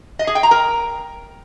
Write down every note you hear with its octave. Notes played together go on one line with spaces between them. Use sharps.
D#5
G#4
G5
A#5
A#4